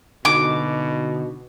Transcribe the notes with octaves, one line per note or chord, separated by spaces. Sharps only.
B2 D3 D#4 F#4 D6